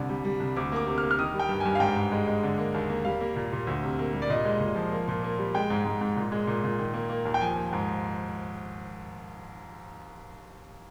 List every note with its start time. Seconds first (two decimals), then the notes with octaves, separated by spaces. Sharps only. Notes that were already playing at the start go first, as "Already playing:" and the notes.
Already playing: C2 D3
0.09 G3
0.25 G3
0.40 C2
0.56 D2 D6
0.72 A#3 D6
0.87 C3
0.98 F6
1.03 A#3
1.11 F6
1.18 D#3 D#6
1.34 G3
1.39 G5
1.49 G2
1.60 G#5
1.65 G2
1.75 F5
1.80 G#2 G5
1.96 G#2
2.12 G#3
2.27 G#3
2.43 D3
2.58 A#3
2.74 D#2
2.89 A#3
3.05 G3 F5
3.21 A#3
3.36 A#2
3.52 A#2
3.67 D2
3.83 C3
3.99 A#3
4.13 G3
4.22 D5
4.30 A#2 D#5
4.45 G#3
4.60 A#2
4.76 F3
4.92 A#3
5.08 A#2
5.23 A#3
5.38 G3
5.54 G#3 G5
5.70 G#2
5.85 G#2
6.01 G#2
6.16 A#2
6.32 G#3
6.47 A#2
6.64 A#2
6.79 D#3
6.94 A#3
7.10 A#3
7.25 D#2
7.34 G5
7.41 F3 G#5
7.56 A#3
7.72 G#2